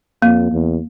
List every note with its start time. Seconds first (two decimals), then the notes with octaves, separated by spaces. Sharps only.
0.22 F2 A#3
0.52 E2